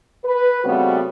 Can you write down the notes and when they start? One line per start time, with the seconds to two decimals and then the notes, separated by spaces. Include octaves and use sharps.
0.25 B4
0.64 C#3 G3 A3 B3 C4 F#4